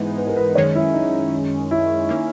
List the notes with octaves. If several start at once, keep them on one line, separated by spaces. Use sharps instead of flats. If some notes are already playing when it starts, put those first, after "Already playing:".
Already playing: G#2 E3 G#3 B3 D#4
B4
A#4
B4
F#2 D#3 G#3 C#4 C#5
E4
D#4
E4
D#3 A#3 C#4